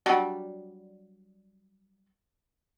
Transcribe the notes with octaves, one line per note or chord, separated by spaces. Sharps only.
F#3 G3 D4